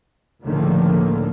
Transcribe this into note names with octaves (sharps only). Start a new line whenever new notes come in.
C#2 A2 D3 D#3 F3 A#3